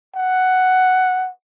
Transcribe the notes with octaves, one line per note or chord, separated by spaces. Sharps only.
F#5